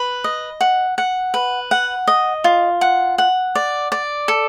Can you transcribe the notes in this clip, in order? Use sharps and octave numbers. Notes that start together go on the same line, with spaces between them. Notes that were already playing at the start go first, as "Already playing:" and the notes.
Already playing: B4
D#5
F#5
F#5
B4
F#5
D#5
F4
F#5
F#5
D5
D5
A4